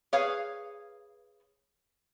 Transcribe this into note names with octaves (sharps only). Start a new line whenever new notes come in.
G#4 B4 C#5 F5